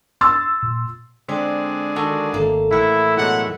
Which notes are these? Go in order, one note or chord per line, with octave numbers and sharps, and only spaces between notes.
C6 E6 A6
A#2
D3 G#3 C4 D5 D#5 F5
D#3 D4 F#4 A4
G#1 A3 A#3
A2 E3 E4 E5 F#5
B2 F#3 G#3 F#5